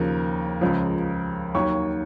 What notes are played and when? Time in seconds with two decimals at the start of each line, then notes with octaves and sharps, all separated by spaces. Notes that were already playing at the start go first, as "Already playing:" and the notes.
Already playing: D#2 C#3 F3 A#4
0.61 C#2 C#3 F3
1.55 D#2 D#3 F#3 C#5 C#6